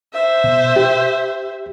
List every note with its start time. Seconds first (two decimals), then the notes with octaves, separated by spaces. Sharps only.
0.13 C5 E5
0.44 B2
0.76 G4